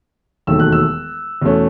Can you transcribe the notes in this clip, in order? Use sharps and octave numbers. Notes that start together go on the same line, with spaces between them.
E1 D#2 D#3 F#3 A3 E6
F#6
E6
E2 B2 A3 C#4